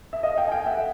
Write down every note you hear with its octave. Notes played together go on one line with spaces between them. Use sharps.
E5
D#5 F5
F5 G5
G#5
F5 G5
E5 F#5